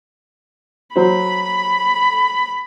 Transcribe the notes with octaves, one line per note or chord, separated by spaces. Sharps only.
F#3 C5 B5